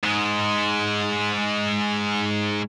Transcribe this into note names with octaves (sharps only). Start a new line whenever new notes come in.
G#2 G#3